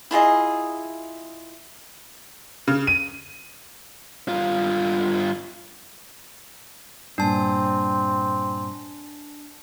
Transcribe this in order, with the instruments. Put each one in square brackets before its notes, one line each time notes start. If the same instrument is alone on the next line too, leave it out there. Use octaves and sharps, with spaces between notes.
[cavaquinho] E4 F4 G#4 D#5
[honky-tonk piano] C#3
D#7
[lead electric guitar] G2 F4
[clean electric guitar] G2 A#2 [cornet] C4 [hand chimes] D4 A5